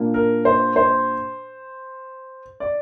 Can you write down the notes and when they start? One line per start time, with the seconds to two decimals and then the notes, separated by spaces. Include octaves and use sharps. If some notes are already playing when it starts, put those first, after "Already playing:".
Already playing: A#2 A#3 D4
0.14 A#4
0.45 C5
0.76 C5
2.60 D5